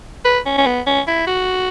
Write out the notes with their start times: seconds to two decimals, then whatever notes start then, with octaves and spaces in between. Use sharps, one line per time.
0.25 B4
0.46 C#4
0.58 C#4
0.66 B3
0.87 C#4
1.08 E4
1.27 F#4